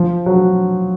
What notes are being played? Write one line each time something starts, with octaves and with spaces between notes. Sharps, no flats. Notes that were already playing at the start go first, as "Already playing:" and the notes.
Already playing: F3
F#3